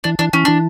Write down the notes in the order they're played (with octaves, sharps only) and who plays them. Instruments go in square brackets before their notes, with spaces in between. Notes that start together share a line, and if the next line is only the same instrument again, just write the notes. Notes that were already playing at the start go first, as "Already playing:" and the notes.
[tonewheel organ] E3 [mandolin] D4
[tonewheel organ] E3 [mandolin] D4
[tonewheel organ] E3 [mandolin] C#4
[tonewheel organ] E3 [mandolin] D4